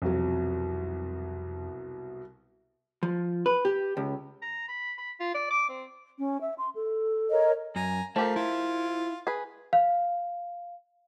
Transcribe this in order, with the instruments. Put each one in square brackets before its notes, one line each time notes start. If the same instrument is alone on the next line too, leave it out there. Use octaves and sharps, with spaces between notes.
[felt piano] C2 B2 F#3 [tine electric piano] F2
[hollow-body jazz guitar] F3
B4
G4
C#2
[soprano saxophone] A#5
B5
B5
F4
D5
D6
C4
[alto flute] C#4
E5
C6
A4
[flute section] A#4 C#5 D#5
[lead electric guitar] F#2 [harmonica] G#5 A#5
[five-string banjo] F3 G4 A#4 [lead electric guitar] A3 [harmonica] F5
[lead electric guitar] E4 [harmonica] F4
[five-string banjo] G#4 B4
[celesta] F5